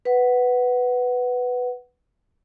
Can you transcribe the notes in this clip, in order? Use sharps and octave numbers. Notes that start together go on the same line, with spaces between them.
B4 F#5